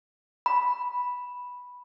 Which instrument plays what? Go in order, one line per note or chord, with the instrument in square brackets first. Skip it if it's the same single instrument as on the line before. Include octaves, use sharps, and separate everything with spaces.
[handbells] B5